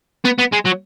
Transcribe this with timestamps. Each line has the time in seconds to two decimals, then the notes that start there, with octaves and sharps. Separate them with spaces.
0.25 B3
0.39 B3
0.53 G#3
0.66 F#3